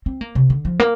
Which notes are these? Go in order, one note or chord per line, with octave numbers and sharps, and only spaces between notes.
C4
A#3
C3
D3
F3
A#3